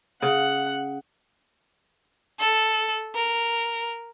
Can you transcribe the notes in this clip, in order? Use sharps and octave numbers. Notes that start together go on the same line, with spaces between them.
C#3 F#5
A4
A#4